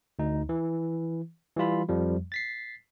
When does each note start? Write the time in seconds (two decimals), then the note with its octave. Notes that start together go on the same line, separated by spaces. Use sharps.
0.19 D2 D#4
0.49 E3
1.57 E3 G3 F4 B5
1.88 F2 F3 G3
2.32 A6 B6 C7